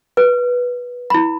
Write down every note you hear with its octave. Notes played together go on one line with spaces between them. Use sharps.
B4
E4 B5